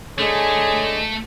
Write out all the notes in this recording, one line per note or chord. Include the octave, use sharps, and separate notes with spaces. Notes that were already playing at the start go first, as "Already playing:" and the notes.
D3 G#3 A3 G#4 C#5